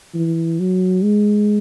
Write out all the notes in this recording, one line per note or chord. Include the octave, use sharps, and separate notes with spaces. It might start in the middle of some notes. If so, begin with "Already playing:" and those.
E3
F#3
G#3